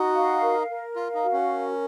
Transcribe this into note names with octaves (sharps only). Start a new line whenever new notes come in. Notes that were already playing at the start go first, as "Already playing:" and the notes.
Already playing: D#4 F#4
F5
A#4
A#4
F4 F5
D#4
F#4
C#4
A#4